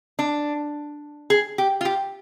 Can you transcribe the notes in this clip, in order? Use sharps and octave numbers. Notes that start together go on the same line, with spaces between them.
D4
G#4
G4
F4
G4